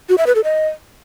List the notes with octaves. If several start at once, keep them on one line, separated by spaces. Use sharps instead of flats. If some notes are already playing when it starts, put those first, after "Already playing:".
F#4
E5
B4
A4
D#5